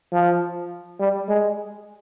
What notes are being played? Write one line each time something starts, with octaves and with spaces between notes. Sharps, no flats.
F3
G3
G#3